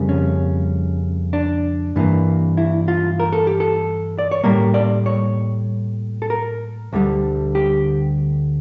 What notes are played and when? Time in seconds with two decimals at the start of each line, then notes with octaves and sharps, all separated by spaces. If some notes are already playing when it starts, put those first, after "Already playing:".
Already playing: F2 C#3 G3 A#3
0.09 C#4
1.33 D4
1.96 G2 E3 A#3
2.57 E4
2.88 F4
3.20 A#4
3.33 A4
3.47 G4
3.60 A4
4.19 D5
4.31 C#5
4.44 A2 G3 A#3 A#4
4.74 D5
5.06 C#5
6.22 A4
6.30 A#4
6.93 D2 D3 G3
7.55 G4